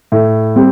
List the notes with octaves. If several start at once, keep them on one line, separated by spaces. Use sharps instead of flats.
A2
G3 C4